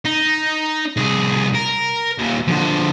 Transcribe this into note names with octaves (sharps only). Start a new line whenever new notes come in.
D#4
C2 G#4
A#4
D#2 A#2
D3 F3